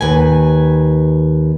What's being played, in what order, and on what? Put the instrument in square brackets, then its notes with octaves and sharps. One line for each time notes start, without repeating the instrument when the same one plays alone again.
[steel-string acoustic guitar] D#2 B4 G#5